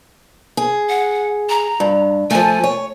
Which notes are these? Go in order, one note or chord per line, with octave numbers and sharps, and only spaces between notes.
G#4
F#5
A#5
G2
F3 A3 G#5
C#5